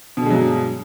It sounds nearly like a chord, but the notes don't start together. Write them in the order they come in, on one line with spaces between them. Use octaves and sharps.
B2 D3 G#3 F#3 G2